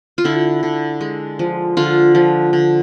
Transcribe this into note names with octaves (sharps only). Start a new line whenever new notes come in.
F4
D3 E4
D3
G#3
F3
D3 F4
F3
D3